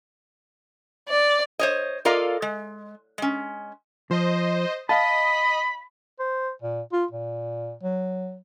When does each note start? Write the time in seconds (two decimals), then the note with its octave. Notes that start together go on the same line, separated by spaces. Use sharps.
1.09 D5
1.59 C5 C#5 D#5
2.05 F4 A4 A#4 D5 D#5 F5
2.42 G#3
3.18 G#3 C#4
4.11 F3 C5 D#5
4.89 D#5 F5 A5 B5
6.19 C5
6.62 A#2
6.92 F4
7.11 A#2
7.83 F#3